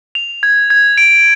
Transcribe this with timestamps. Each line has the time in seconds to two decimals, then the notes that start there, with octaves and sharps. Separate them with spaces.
0.15 F7
0.43 G#6
0.70 G#6
0.98 D7